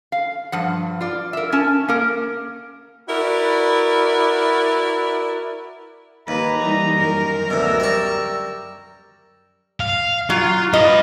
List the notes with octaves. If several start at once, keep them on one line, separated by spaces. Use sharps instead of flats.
F5
G2 F3 F#5
F4 D5
A#4 E5
C#4 A5
A#3 A#4
E4 F#4 A#4 B4 D5
D#2 B4 A#5
E3 G3 D#4
F#2 A#4
D2 B2 E6
G3 C#6
F5
F#3 F4
B4 D#5 F5